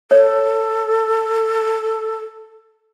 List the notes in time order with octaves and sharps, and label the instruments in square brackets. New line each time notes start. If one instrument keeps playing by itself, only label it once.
[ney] A4 [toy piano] C#5